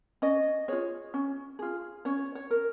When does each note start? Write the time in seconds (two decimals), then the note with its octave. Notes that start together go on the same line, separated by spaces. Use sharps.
0.22 C#4 D#5
0.68 F4 G#4 C#5
1.14 C#4
1.59 F4 G#4
2.05 C#4 C#5
2.35 C#5
2.51 A#4